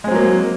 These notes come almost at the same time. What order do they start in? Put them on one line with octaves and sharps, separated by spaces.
G#3 C4 F#3 A#3